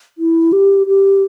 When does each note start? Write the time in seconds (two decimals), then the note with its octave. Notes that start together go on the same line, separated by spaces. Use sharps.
0.18 E4
0.52 G4
0.87 G4